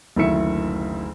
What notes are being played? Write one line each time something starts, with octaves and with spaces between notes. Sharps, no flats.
F#1 D2 D#3 E4 E5 C#7